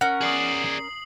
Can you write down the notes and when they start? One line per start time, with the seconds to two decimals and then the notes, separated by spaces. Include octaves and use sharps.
0.01 C#4 A#4 F#5
0.21 G#4 D5 D#6 C7 F#7